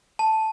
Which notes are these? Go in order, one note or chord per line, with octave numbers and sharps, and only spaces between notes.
A5